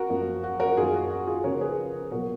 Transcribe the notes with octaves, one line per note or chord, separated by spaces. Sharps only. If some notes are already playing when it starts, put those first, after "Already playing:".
Already playing: F#4 A#4
F#2 F3 A#3
F#4
F#4 A#4
F#2 D#3 A#3 F4 G#4
F4
F#4
F#4
F4 G#4
C#3 F3 A#3 A#4 C#5
G#4 B4
B2 F#3 A#3 F#4 A#4